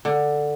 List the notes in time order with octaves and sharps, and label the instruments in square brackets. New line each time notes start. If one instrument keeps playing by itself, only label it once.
[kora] D3